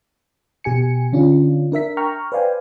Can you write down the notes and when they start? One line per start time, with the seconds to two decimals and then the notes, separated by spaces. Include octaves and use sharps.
0.64 B2 G4 G#5 C#7
1.13 D3 C#4 D4 F4
1.72 D4 A#4 E5 B6
1.97 G5 A#5 C#6 F6
2.32 B4 C5 D5 F5 G5 G#5